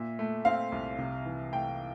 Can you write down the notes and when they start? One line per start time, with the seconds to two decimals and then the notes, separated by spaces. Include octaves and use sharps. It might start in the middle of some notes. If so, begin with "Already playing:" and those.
Already playing: A#2 E5
0.19 A3
0.45 C4 F5
0.72 C2
0.98 C3
1.25 E3
1.52 A3 G5